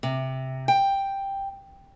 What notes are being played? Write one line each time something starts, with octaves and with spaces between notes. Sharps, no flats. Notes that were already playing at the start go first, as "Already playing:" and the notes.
C3
G5